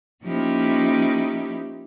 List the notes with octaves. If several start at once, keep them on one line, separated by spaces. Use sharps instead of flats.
F3 A#3 C#4 D#4 E4 G4